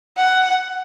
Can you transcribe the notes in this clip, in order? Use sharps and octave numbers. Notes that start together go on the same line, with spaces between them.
F#5